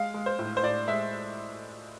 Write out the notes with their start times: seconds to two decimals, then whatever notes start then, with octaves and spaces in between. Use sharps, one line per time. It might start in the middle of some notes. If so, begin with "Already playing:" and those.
Already playing: G#3 F5
0.14 G#3
0.26 C5
0.39 A2
0.57 C5
0.63 A2 D5
0.88 G#3 E5